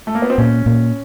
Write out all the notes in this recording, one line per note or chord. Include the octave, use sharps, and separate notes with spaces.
A3
A#3
B3
C4
A#2 C#4
A#2